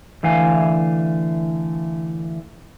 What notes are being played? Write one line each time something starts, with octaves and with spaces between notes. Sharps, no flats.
D3 E3 A3 F5 G#5